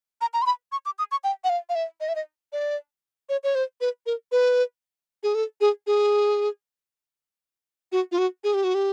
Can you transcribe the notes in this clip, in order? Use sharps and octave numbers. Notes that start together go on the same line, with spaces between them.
A#5
A#5
C6
B5
C#6
D6
D#6
C#6
G5
F#5
F5
F5
E5
D#5
E5
D#5
D5
C#5
C#5
C5
B4
A#4
B4
G#4
A4
G#4
G#4
F#4
F4
F#4
G#4
G4
F#4
G4